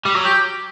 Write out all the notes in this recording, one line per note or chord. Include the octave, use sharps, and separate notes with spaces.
G3
F#3
G4